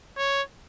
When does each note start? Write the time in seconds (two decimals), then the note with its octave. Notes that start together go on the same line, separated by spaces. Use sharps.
0.18 C#5